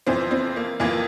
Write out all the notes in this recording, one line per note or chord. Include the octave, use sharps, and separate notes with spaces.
F2 E3 C4
C4
A#3
F2 E3 A#3